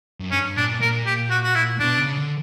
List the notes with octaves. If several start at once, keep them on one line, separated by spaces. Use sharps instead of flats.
F#2
G2 C#4
A#2 D4
A#2 A#4
G4
F#4
F#4
E4
B2 D4
C#3
D3